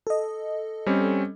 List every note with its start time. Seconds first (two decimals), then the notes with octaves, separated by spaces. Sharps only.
0.07 A4 D#5
0.86 G3 C4 C#4